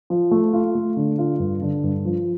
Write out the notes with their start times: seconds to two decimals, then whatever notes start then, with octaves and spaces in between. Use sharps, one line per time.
0.10 F3
0.31 A3
0.53 F4
0.75 A3
0.97 D3
1.18 F4
1.40 G2
1.62 D3
1.84 G2
2.05 F3